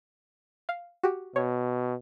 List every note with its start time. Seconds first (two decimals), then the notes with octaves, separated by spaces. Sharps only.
0.69 F5
1.03 F#4 G4
1.36 B2 C#5